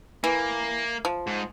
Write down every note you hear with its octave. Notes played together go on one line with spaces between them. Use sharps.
E3 A#3
F3
G#2